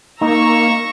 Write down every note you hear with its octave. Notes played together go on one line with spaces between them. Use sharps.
A#3 D#4 A#5 C#6 E6